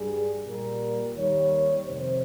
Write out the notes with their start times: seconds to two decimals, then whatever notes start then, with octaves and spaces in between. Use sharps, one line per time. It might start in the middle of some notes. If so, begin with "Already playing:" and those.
Already playing: G2 G3 G#4
0.46 A#2 G3 A#4
1.14 D#2 D#3 G3 C#5
1.84 F2 C3 D#3 C5